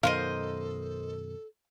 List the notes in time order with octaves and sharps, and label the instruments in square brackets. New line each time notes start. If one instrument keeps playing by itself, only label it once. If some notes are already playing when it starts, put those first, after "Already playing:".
[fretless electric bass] F#2 B2 D#3 [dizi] A4 [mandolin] A#4 C5 D#5 [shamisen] F5